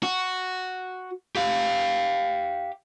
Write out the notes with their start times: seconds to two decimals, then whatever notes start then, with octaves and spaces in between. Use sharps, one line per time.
0.03 F#4
1.35 G4 F5